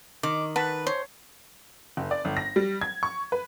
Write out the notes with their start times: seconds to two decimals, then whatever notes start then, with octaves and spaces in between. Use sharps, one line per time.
0.23 D#3 D6
0.56 B4 F#5 A5 B5
0.87 C5 C#5
1.97 F#1
2.11 D5
2.25 G1
2.37 A#6
2.56 G3
2.81 G#6
3.03 C#6
3.32 B4